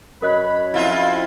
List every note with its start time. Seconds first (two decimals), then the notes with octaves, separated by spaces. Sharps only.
0.22 F#2 A#4 C#5 D#5 B5 F#6
0.74 F2 E4 F4 E5